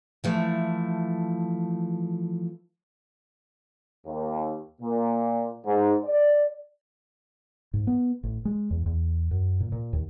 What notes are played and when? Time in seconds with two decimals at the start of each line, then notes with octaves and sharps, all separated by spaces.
0.24 E3 F3 A3
4.06 D#2
4.81 A#2
5.65 G#2
6.04 D5
7.73 G#2
7.87 B3
8.23 A1
8.45 G#3
8.71 E2
8.86 E2
9.31 F#2
9.60 A#2
9.72 A#2
9.93 D#2